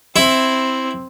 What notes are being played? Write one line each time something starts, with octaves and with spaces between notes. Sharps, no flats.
C4 E4